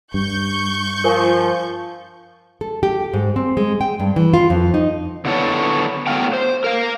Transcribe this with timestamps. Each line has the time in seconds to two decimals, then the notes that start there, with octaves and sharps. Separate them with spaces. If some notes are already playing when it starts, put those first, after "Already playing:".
0.14 G2 C#6 G6
1.04 F3 A#4 C5 G#5
2.61 A4
2.83 G4
3.13 G#2
3.36 C4
3.57 G#3
3.81 G5
4.00 G2
4.16 E3
4.34 F4
4.50 F2
4.74 D#4
5.25 D3 F#3 B3 E4 A4 C#5
6.07 A2 F#3 B3 F#4 F5 G5
6.33 C5
6.64 A#4 F5